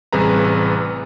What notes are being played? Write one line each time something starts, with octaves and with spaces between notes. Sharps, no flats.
A1 C3 G3 G#4 B4 A#5